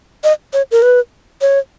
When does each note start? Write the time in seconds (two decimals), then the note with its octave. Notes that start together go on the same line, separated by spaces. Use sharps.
0.24 D#5
0.53 C#5
0.71 A#4
0.82 B4
1.41 C#5